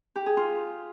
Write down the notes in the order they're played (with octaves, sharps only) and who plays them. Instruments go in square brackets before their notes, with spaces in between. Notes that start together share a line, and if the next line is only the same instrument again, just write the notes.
[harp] G4
G#4
F4